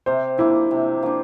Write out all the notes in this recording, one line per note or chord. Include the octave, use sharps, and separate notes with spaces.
C3 C5
F3 A#3 D4 E4
C3
F3 A#3 D4